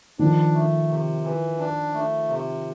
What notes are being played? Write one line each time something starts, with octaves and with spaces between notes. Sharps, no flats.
D#3 F3 D4
A3
C3
E3
D4
A3
C3